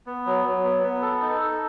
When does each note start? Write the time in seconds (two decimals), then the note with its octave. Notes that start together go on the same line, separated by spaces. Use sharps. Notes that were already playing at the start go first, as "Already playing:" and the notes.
0.06 B3
0.26 F#3
0.44 F#3
0.63 B3
0.83 B3
1.02 A4
1.22 D#4
1.41 A4